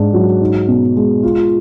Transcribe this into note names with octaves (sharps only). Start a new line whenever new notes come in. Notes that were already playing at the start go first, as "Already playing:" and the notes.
Already playing: G#2 D4
F#3
D#4
B2
G#3
F4